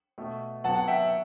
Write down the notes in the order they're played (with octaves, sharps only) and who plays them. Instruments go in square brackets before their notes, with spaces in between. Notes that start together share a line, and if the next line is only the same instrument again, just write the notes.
[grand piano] B2 A3
C3 F#3 B3 F#5 A5
F#5
E5 G5
E5